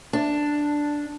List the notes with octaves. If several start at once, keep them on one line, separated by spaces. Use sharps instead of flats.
D4